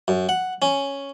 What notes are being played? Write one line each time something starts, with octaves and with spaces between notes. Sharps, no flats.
F#2
F#5
C#4